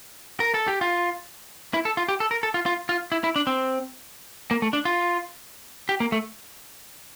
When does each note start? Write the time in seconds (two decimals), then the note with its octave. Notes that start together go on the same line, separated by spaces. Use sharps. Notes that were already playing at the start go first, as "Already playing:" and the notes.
0.40 A#4
0.54 A4
0.68 G4
0.81 F4
1.74 E4
1.85 A4
1.97 F4
2.09 G4
2.20 A4
2.31 A#4
2.43 A4
2.54 F4
2.66 F4
2.89 F4
3.12 E4
3.24 E4
3.36 D4
3.47 C4
4.51 A#3
4.62 A3
4.73 D4
4.85 F4
5.89 G4
6.00 A#3
6.12 A3